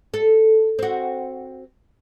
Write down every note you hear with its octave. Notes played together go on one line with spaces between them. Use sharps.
A4
C4 F#4